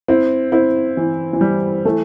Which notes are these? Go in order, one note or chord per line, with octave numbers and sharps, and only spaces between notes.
C4 E4
C4 E4
E3
E3
G3
E3 A3